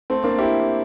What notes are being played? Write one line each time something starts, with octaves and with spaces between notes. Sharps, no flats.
A3 C4
A#3 D4
E4 G4